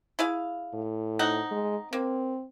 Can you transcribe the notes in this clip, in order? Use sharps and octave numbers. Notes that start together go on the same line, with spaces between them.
E4 G#4 F5
A2
C4 D#4 F#5
G#3
A#3 C4